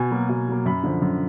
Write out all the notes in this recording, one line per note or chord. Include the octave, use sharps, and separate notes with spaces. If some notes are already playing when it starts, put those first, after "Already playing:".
Already playing: B2 G#5
F#3 A#3
B2
F#3 A#3
F#2 B5
D3 F3
F#2